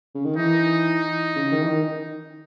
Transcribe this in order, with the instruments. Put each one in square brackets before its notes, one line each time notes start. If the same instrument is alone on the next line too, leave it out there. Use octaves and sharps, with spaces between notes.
[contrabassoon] C#3
D#3
[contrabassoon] E3 [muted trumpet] D#4
[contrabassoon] C#3
D#3
E3
D#3